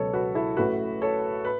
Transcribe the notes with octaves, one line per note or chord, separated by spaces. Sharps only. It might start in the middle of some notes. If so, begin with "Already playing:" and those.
Already playing: C#2 B2 F#3 B3 A4 C#5
F#4 B4
E4 A4
A1 A2 A3 F#4 B4
A4 C#5
B4